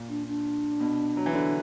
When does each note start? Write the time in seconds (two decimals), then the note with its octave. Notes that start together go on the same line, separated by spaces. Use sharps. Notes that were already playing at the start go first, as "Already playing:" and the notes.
Already playing: A#2
0.09 D4
0.27 D4
0.80 B2
1.17 F#3
1.26 E3
1.34 D3 D4